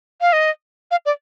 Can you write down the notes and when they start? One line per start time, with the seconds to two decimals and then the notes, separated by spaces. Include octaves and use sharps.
0.21 F5
0.33 D#5
0.91 F5
1.06 D5